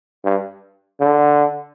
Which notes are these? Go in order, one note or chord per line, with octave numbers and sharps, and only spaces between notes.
G2
D3